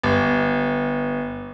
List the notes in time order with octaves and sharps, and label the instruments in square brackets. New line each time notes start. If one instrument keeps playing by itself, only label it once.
[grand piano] G1